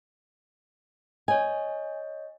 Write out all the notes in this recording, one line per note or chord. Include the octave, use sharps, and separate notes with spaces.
C#5 D#5 G#5